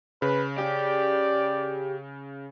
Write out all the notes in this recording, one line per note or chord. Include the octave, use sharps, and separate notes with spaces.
C#3 B4
G4 D5